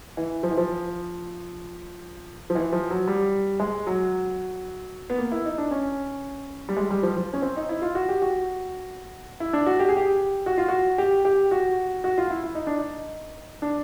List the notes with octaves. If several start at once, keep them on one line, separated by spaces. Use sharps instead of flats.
E3
F3
E3
F3
F3
E3
F3
F#3
G3
G#3
F#3
B3
A#3
E4
D#4
D4
C#4
G3
G#3
G3
F3
F3
C#4
C4
D#4
E4
F4
F#4
G4
F#4
E4
D4
F#4
G4
G#4
G4
F#4
F4
F#4
G4
G4
F#4
F#4
F4
E4
E4
D#4
D4
D#4
D4